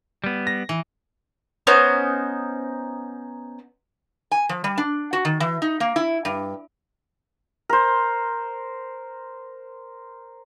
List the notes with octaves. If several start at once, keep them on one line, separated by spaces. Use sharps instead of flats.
G3 B3
A#6
E3
B3 C#4 D#4 C5
G#5
F3
G3
D4
F#4
D#3
E3
D#4
A#3
E4
G2
A#4 C5